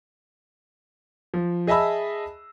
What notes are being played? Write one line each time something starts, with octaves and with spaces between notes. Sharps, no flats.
F3
G#4 D#5 E5 A5 B5 E6